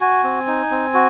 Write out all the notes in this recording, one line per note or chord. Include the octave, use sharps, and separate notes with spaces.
F#4 G#5
C4
D#4
C4
F#4